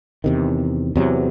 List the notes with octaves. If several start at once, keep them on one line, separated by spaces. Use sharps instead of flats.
E2 C3 D#3
E2 C3 F#3